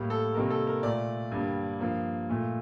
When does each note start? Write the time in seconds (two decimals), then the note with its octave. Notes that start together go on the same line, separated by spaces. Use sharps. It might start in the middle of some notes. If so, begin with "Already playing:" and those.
Already playing: A2 G3 A#3
0.10 A4
0.35 C3 D#3 G3 A#3 A#4
0.50 A4
0.67 A#4
0.83 A#2 A3 D5
1.32 G2 D3 G3 A#3
1.80 G2 F3 A#3
2.30 A#2 A3